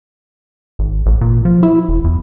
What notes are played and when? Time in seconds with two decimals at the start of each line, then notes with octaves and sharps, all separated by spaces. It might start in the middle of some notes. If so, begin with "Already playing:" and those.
0.79 G#1
1.06 A1
1.21 A#2
1.45 F3
1.63 E4
1.89 E1
2.04 E2